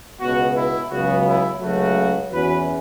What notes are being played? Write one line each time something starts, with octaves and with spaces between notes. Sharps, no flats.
C#2 B2 B3 F#4
E4
C#2 C#3 F#3 B3 F#4
E4
C#2 C#3 F#3 A3 F#4
E2 E3 C#4 F#4 B4